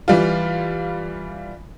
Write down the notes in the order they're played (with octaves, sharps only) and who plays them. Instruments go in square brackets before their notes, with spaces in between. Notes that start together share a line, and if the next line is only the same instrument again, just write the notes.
[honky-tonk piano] E3 G3 F4